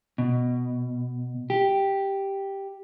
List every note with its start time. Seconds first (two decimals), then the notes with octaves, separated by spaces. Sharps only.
0.18 B2
1.50 G4